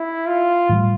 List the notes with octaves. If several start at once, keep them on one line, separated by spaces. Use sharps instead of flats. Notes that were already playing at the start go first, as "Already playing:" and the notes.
Already playing: E4
F4
A2 E3 G3